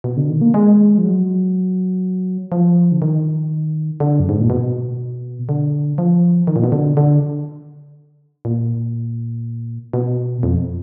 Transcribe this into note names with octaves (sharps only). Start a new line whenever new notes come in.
B2
D3
D#3
A#3
G#3
F3
F#3
F3
D3
D#3
D3
F#2
G#2
A#2
B2
D3
F3
D#3
A#2
B2
D3
D3
A#2
B2
F2